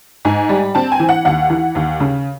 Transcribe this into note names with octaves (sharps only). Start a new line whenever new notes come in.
G#2 G#5
G3
C4 A5
G#5
E3
F#5
D#2 F#5
E3
D#2
C#3